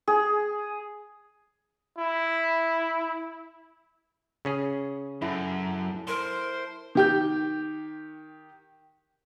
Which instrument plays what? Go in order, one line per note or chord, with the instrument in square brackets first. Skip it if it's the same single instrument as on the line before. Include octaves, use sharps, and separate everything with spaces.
[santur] G#4
[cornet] E4
[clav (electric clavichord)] C#3 C#4 G#4
[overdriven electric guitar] F#2 [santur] E4 A4
[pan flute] A#4 [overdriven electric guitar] C5
[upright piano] D#3 G4 G6